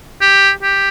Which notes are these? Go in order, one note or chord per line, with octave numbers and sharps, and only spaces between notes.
G4
G4